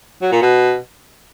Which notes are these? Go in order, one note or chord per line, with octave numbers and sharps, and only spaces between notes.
F#3
A#2
B2